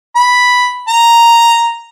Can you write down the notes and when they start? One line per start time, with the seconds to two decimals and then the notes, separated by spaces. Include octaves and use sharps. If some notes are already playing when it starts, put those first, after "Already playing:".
0.16 B5
0.88 A#5